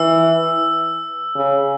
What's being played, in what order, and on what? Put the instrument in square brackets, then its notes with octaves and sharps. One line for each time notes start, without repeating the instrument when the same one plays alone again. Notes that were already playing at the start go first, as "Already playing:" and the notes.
Already playing: [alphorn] E3 [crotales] E6
[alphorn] C#3